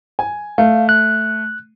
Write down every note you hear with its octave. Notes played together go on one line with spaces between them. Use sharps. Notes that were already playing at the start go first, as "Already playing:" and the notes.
G#5
A3 F5
F#6